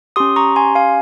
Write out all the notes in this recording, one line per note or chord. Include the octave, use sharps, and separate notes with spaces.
C#4 G4 C6 D#6
A#5 C#6
G#5 C6
F5 G#5